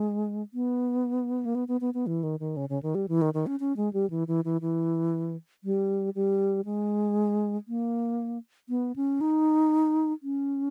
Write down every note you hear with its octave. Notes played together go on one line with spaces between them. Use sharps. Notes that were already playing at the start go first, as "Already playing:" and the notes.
Already playing: G#3
B3
A#3
B3
B3
B3
B3
E3
D#3
D#3
C#3
C#3
D#3
G3
E3
D#3
D#3
C#4
C#4
G#3
G3
E3
E3
E3
E3
G3
G3
G#3
A#3
B3
C#4
D#4
C#4